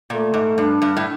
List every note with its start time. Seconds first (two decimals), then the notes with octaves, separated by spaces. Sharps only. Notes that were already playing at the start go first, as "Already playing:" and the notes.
0.10 A#2 A3
0.34 G#2
0.58 G2 D4
0.82 G2
0.97 A2